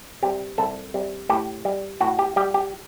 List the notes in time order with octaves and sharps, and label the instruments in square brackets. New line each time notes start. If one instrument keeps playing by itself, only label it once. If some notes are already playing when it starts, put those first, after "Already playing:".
[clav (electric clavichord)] C3 G3 G4
C2 A4
C3 G3
A2 G4
G3
A2 F#4
G4
G3 G4
G4